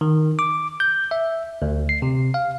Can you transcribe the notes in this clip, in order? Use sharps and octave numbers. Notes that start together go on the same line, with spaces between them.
D#3
D6
G6
E5
D2
C7
C3
F5